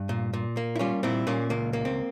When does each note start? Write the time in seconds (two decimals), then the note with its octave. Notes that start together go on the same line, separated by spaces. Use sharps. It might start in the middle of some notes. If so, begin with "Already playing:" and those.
Already playing: G2
0.09 A#2
0.33 A#2
0.57 A#3
0.76 E4
0.79 G3 C#4 F4
1.03 A#2 C4 E4
1.27 A#2 A#3 C#4
1.50 C#2 A#3
1.73 A#3
1.85 C4